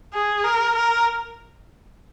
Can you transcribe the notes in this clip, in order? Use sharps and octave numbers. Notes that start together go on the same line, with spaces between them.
G#4
A#4
A#4